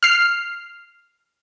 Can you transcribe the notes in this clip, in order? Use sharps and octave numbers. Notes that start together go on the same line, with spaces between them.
F6 C7